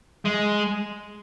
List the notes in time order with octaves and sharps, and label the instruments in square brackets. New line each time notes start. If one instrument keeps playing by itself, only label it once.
[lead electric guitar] G#3